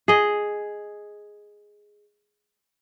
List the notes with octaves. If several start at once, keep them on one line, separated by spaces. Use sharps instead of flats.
G#4 D#5